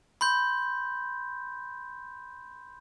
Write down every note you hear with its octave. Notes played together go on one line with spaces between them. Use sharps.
B5 C6 G6